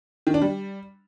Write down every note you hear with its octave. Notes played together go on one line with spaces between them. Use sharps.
D#3
D4
G3